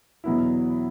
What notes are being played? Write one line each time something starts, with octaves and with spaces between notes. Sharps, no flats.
E2 B2 F#3 B3 E4